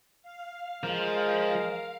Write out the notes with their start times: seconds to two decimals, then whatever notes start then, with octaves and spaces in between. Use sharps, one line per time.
0.23 F5
0.83 F3 G#3 A#4